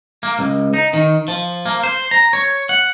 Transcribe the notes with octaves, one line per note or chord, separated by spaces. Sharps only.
A#3
C#2
D#4
D#3
F3
A#3
C5
A#5
C#5
F#5